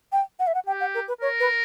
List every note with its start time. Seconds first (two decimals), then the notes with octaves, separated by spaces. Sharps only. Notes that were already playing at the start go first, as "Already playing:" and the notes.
0.12 G5
0.39 F#5
0.47 E5
0.55 F#5
0.66 G4 G5
0.80 F#5
0.95 A#4
1.08 B4
1.21 A#4 C#5
1.40 B4